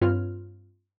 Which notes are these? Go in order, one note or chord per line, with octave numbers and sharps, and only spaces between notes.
G2 C4 F4 B4 C#5 F6